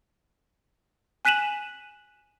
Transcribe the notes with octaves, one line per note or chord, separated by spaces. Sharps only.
G#5 F#6 B6 D#7 E7 F#7